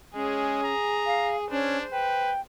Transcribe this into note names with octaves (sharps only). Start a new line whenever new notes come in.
G#3 C#4 G#4
A#5
F5
C#4 D4 C5
B4 G5